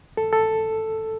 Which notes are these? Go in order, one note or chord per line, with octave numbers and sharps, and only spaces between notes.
A4
A4